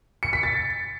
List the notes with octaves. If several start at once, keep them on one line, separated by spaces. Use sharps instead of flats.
C#7
B6
A6